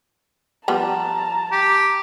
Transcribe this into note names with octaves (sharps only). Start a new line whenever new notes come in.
F3 G3 B3 A5 A#5
G4